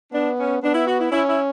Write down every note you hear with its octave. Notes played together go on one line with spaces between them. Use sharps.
B3 D4
C#4
B3 D4
E4
F#4
E4
C#4 E4
E4